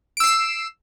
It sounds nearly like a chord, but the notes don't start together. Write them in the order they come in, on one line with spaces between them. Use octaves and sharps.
D7 E6 C7 E7